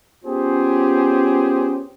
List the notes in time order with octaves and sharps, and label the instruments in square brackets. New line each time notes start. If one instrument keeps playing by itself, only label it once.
[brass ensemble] B3 C#4 F4 G4 G#4 C5